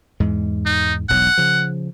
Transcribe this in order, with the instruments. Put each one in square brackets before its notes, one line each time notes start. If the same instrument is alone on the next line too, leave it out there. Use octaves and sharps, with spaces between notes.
[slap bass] E2 G#2 G#3
[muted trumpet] D#4
[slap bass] E1 B1 F#3 [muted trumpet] F#5
[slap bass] C#3 F3